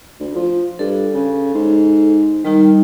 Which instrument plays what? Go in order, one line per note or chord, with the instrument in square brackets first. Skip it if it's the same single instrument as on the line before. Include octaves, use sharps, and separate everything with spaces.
[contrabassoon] D2
F3
[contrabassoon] G2 [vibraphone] A4
[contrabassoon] C#3
G#2
[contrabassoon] D#3 [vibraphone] G3 D#4